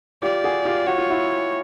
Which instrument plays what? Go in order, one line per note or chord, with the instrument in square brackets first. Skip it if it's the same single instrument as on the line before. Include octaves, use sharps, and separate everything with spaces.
[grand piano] F4 G4 [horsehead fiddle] D5
[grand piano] F#4 G#4
F4 G4
[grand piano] F#4 [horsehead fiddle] C#5
[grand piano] F4
E4 F#4